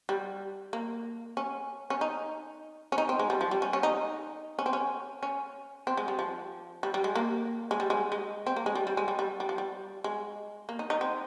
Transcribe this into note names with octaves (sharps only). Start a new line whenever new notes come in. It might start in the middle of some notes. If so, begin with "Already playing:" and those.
G3
A#3
C#4
C#4
D#4
C#4
D#4
C4
G#3
G3
F3
G3
C#4
C#4
D#4
C#4
C4
C#4
C#4
C4
G#3
G3
F3
G3
G3
G#3
A#3
G#3
G3
G#3
G#3
C4
A#3
G#3
G3
G3
G#3
G3
G3
G3
F3
G3
G#3
A#3
D#4
D#4
C4